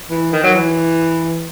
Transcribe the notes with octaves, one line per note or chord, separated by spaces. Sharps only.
E3
D#3
F#3
E3